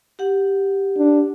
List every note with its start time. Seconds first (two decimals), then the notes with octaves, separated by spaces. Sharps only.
0.19 G4 F#5
0.98 D4